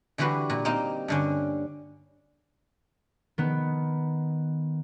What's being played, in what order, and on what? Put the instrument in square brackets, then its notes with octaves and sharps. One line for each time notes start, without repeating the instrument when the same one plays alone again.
[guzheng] D3 E3 G3 F#4 B4
A#2
A#3 C4 D#4
G2 D3 C#4
[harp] D#3 B3